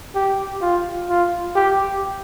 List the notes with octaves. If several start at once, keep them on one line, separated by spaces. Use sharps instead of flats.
G4
F4
F4
G4